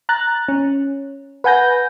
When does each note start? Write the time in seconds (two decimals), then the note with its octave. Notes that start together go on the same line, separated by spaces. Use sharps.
0.09 A#5 F#6 A6
0.48 C#4
1.44 B4 F#5 G#5 G6 A#6